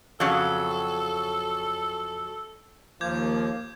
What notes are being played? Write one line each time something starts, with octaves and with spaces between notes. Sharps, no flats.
F2 C#3 F#3 A4
D#2 F3 A#3 D6 G6 G#6